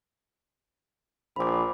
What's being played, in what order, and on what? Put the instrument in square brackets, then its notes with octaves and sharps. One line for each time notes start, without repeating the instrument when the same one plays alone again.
[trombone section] A#1 F3 [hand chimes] B5 D6